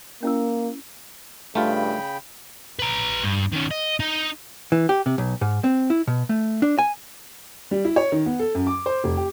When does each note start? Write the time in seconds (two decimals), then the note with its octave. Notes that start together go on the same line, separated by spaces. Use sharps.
0.23 A#3 C#4 E4 E6
1.55 G2 C#3 A3 F4 G5 B5
2.79 B4 A#5
3.24 G2
3.52 D#3 C#4
3.71 D#5
4.00 D#4
4.72 E3
4.89 G4
5.06 C3
5.18 B1
5.41 G#2
5.64 C4
5.90 E4
6.07 B2
6.29 A3
6.62 D4
6.79 G#5
7.71 G3
7.85 E4
7.96 C#5
8.12 D#3
8.26 B3
8.39 A4
8.55 F#2
8.67 D6
8.86 C5
9.04 F1
9.17 G4